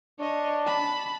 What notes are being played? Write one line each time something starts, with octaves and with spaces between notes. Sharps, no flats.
D4 C#5 D#5
A5 B5